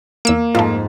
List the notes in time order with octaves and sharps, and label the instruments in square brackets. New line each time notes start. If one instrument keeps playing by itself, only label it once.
[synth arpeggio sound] E2 E6 D7 [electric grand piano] A#3
[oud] F2 G#2 [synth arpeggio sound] F4 A4